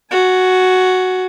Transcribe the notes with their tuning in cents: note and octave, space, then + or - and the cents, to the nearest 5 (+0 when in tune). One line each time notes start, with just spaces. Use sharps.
F#4 +0 G#5 +25